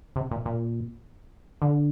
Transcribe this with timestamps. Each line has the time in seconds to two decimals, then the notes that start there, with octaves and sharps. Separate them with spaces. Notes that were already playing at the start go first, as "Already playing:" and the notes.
0.16 C3
0.31 A#2
0.45 A#2
1.62 D3